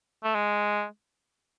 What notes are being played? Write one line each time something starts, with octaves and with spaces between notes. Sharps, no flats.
A3
G#3